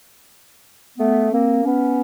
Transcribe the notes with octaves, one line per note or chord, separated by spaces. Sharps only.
A3 B3
A#3 C4
B3 C#4